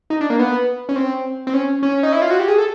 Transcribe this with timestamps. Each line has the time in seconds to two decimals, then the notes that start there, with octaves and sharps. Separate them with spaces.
0.10 D#4
0.21 D4
0.30 A#3
0.39 B3
0.89 C#4
0.96 C4
1.47 C4
1.54 C#4
1.83 C#4
2.03 D#4
2.13 E4
2.22 F4
2.31 F#4
2.40 G4
2.48 G#4
2.58 A4